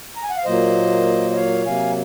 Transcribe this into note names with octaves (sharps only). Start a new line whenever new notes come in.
A#5
G#5
F#5
F5
A#2 F#3 A#3 C5 D#5
D#5
C#5 F5
C3 F#3 A#3 F5 G#5